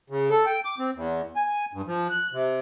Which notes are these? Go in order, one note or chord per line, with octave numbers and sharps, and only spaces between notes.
C#3
A4
G5
D6
C4
E2
G#5
G2
F3
F#6
C3